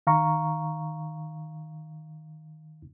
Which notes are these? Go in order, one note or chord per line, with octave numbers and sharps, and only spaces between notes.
D#3 F5 A#5 C#6